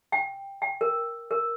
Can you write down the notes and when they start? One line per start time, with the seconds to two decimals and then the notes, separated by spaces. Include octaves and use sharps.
0.12 G5
0.62 G5
0.81 A#4
1.31 A#4